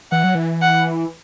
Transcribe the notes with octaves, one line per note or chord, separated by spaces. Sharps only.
E3 F#5
F#3
E3
F#5